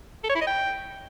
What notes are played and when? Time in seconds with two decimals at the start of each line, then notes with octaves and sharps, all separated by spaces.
0.24 A4
0.30 C#5
0.35 E4
0.41 D#5
0.47 G5